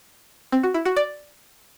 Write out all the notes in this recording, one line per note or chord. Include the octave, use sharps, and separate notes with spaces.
C4
F#4
E4
F#4
D5